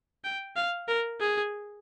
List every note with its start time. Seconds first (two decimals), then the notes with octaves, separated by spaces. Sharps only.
0.24 G5
0.56 F5
0.88 A#4
1.20 G#4